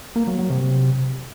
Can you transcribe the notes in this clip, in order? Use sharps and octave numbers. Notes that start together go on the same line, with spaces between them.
A#3
F#3
F#3
C3